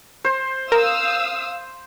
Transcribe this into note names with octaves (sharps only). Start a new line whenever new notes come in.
C5
A#4 F5 D#6 E6